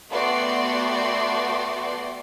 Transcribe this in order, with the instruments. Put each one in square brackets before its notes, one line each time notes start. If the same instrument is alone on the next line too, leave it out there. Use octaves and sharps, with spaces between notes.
[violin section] A3 B3 F#4 D5 G5 C6